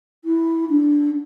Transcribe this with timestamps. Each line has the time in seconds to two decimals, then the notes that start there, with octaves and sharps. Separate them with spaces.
0.24 E4
0.69 D4